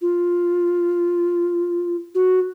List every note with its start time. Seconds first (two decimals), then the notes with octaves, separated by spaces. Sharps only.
0.02 F4
2.15 F#4